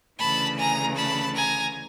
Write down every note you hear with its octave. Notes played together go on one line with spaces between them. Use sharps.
D2 C#3 E3 A5 B5
G#5 A#5
A5 B5
G#5 A#5